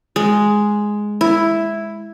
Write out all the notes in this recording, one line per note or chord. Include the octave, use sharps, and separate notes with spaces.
G#3
E4